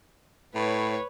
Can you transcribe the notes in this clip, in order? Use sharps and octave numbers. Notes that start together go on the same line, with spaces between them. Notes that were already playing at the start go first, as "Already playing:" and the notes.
A2 B4 C#5